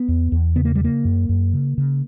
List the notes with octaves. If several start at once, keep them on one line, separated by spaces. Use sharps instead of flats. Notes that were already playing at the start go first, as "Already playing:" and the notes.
Already playing: B3
E2
E2
C#3 B3
A#3
G3
C#3 A#3
F#2
F#2
C#3
C#3